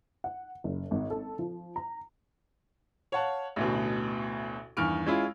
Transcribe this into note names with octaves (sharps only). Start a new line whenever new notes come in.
F#5
F#1
G#1
A4
F3
A#5
C#5 F5 F#5 A5
A1 D2 B2
E2 G2 D#3 C#6 F6 D7
G#3 C#4 E4 F4 B5